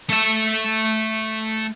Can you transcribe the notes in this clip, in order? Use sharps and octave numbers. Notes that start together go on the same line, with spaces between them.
A3 E5